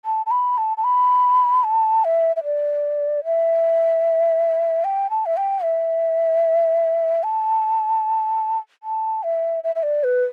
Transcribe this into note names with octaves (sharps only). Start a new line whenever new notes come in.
A5
A5
B5
A5
A5
B5
A5
E5
E5
D5
E5
G5
A5
E5
G5
E5
A5
A5
E5
E5
E5
D5
B4